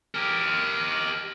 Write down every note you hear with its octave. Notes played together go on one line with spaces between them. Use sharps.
G4 A#4